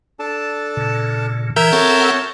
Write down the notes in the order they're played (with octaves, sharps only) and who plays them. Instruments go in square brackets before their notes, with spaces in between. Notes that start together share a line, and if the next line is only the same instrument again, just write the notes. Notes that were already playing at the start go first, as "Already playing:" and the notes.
[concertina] D4 A4 A5
[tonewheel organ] A#2 C#3
[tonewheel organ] E3 [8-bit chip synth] A#4 E5 G6
[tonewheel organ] C4 A4 F#5 [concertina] F#4 C#5 A5